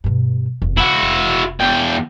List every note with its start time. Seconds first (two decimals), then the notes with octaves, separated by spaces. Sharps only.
0.04 G2 B2
0.62 F1 E2
0.78 C#3 E4 F#4
1.02 F1
1.60 E2 G5